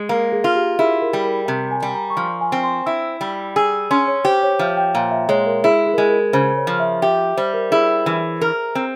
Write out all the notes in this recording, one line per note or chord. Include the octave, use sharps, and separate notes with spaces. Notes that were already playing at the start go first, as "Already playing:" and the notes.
Already playing: G#3
A#3 A#4
G#4
F4
G4
E4 G#4
A#4
G3
A#4
C3 A#4
G#5
G3
A#5
C#6
F3 C6
G#5
C4
C6
E4 E6
G3
G#4 E6
E6
C#4 C6
C#5
G4 C5
C#5
F3 E5
G5
A#2 F5
E5
G#3 C#5
A#4
E4 G#4
G#4
A#4
G#3 G#4
A#4
C#3 C5
C#5
F3
E5
G4 E5
G3 C5
A#4
E4 G#4
E3
A#4
C4